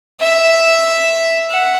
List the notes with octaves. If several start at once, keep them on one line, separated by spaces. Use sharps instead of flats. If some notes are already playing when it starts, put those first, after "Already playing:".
E5
F#5